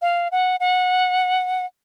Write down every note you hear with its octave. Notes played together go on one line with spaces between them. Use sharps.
F5
F#5
F#5